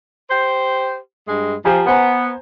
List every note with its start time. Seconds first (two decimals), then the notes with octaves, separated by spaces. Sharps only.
0.30 G4 C5
1.28 G2 G#3
1.65 F3 G4 G#5 A#5
1.87 B3 C5 G#5 A#5